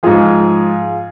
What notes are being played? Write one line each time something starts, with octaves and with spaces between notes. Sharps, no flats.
G#2 F3 F4 G#4